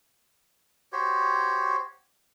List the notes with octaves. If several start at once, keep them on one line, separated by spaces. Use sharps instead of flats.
F#4 G4 C5 C#5